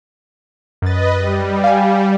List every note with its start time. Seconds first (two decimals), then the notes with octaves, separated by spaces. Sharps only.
0.82 F#2 B4 D#5 A6
1.15 G3
1.64 F5 G#5